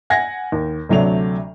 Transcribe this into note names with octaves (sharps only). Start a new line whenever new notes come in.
F#5 G#5 G#6 A#6
D#2
D2 C3 F#3 A3 D5 F7